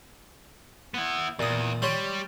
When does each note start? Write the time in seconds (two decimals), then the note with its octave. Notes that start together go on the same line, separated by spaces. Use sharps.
0.94 B3 E4
1.39 E2 A#2 D#6
1.82 G3 C#5 B5 C6